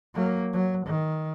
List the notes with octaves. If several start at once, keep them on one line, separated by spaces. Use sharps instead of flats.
F#3 A#3
F#3
D#3